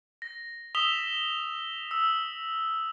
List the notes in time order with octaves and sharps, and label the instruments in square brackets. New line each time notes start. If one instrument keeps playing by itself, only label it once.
[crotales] A#6
D#6 E6 B6 E7 F7 G7
E6